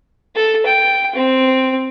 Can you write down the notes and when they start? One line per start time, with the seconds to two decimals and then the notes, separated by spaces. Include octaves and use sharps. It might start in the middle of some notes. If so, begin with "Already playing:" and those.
0.35 A4
0.66 G5
1.15 C4